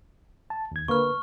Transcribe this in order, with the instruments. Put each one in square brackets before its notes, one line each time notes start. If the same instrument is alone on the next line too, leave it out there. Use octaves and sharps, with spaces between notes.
[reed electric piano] A5
D#2 G#6
[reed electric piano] D3 A#3 B4 [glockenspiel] C#6 F6